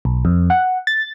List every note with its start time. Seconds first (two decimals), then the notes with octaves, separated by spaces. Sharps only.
0.05 B1
0.25 F2
0.50 F#5
0.87 A6